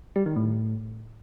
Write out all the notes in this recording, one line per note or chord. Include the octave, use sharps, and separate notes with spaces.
G3
D#3
A2